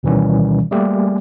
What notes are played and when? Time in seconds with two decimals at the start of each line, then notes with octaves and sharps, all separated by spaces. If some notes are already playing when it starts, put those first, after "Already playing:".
0.03 D2 B2 D#3 E3 G3 C#4
0.71 G3 A3 A#3 G4 G#4